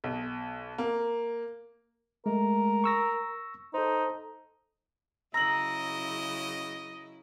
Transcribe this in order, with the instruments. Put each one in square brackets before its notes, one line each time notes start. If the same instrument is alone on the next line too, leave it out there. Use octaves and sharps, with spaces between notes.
[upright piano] B1
A#3
[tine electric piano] G#3 A3 [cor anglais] A#4
[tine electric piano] C#6 E6 A#6
[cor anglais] D#4 [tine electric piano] A4 C5
[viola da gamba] F#2 C#3 E4 [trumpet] D#5 [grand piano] A#5 F#7 [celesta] E6 A#6